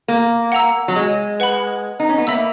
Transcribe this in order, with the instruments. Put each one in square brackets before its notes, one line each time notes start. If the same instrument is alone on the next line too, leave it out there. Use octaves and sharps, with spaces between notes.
[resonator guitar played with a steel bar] A#3
[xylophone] F#5 A#5 E6
[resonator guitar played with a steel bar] F#3
G#3
[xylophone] B4 F#5 B5
[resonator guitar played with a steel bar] D#4
C#4
B3
[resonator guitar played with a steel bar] A#3 [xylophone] E5 B5 E6